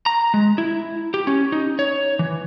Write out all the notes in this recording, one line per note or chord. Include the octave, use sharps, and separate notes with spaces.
A#5
G#3
E4
G4
C#4
D#4
C#5
E3